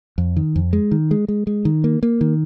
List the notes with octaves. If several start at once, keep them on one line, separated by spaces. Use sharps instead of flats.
F2
D#3
F2
G#3
D#3
G#3
G#3
G#3
D#3
A#3
A#3
D#3